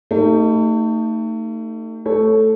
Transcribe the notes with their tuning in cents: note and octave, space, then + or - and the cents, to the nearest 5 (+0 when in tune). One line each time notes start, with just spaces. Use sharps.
A3 +35 D#4 +0 G4 +0
A3 +0 A4 +0 C#5 +0